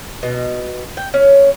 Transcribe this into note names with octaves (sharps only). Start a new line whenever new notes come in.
B2
G5
C#4